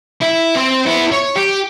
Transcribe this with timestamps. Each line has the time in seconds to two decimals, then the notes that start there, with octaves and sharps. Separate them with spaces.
0.22 E4
0.56 C4 C5
0.86 B3 E4
1.12 C#5
1.36 G4